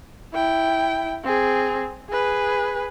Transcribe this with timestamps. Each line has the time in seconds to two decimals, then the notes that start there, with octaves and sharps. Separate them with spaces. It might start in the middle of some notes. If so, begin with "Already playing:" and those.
0.34 E4 G5
1.24 C4 G#4
2.09 G#4 B4